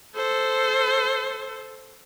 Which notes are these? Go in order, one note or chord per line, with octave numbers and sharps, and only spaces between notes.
A4 C5